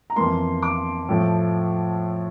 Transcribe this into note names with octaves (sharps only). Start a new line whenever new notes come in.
A#5
F2 E3 A#3 C6
D6
A2 F3 A3